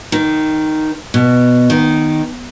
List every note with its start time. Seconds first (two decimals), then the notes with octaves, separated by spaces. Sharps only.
0.12 D#3
1.14 B2
1.70 D#3